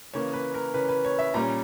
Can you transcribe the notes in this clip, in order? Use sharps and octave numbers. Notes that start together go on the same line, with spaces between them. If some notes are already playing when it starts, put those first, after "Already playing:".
C#3 E3 A#3 C#4 C#5
B4
A#4
C#3 E3 A#3 C#4 B4
B4
C#5
E5
A#2 G3 C#4 A#5